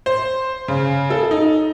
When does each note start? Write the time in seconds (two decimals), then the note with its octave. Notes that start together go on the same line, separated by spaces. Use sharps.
0.06 C5
0.68 C#3
1.10 A4
1.31 D#4